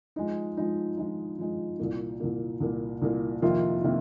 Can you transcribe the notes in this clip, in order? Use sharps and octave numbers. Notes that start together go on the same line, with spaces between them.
F3 G#3 D#4
F3 G#3 D#4
F3 G#3 D#4
F3 G#3 D#4
C2 A#2 A#3
C2 A#2 A#3
C2 A#2 A#3
C2 A#2 A#3
F2 C3 D#3 A#3 F4
C3 D#3 A#3 F4